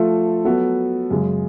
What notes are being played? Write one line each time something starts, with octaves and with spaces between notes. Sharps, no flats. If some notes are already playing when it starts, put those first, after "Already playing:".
Already playing: F3 A3 F4 A4
F#3 B3 F#4 A4
F#2 C#3 G#3